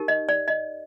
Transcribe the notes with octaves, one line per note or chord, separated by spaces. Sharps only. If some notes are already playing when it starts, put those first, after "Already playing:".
Already playing: D#4 G4 A#4
D#5
D5
D#5